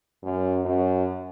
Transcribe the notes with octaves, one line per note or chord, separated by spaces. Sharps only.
F#2
F#2